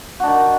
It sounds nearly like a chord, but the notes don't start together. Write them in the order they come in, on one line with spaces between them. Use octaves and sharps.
F#4 D4 D#3